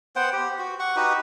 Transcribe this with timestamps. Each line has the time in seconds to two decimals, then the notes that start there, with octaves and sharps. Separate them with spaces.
0.16 B3 C5 F#5 G5
0.33 G4
0.59 F#4
0.80 F#5 C#6
0.96 D#4 F#4 G4 B4